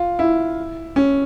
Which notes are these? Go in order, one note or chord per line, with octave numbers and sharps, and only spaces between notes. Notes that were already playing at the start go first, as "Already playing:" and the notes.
Already playing: F4
E4
C#4